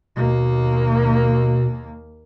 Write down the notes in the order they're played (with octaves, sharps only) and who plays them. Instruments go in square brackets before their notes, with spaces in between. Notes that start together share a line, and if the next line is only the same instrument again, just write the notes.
[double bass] D#2 A#3 [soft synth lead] B2